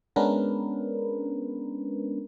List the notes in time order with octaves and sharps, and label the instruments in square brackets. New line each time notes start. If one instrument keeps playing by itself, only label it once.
[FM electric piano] G#3 B3 C#4 D4 A#4 B4